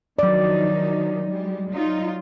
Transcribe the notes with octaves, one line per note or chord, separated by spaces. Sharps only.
D#3 F3 F#3 D#4 D5
G3 G#3
F#3 D#4 F4